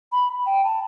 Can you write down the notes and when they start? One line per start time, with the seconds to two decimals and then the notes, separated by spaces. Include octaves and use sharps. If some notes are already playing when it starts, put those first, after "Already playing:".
0.12 B5
0.46 G5
0.64 A5